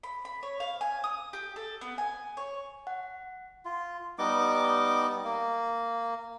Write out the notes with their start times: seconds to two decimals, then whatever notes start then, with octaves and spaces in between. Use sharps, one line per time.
0.03 B5
0.25 B5
0.43 C#5
0.60 F5
0.81 G#5
1.04 D#6
1.33 G4
1.56 A4
1.81 B3
1.98 G#5
2.37 C#5
2.87 F#5
3.65 F4
4.18 G3 B3 D#4 D6
5.24 A#3